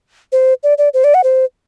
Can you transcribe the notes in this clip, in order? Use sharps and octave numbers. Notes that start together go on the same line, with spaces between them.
C5
D5
D5
C5
D5
F#5
C5